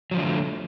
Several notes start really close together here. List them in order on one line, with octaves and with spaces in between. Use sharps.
F#3 F3 D3 A3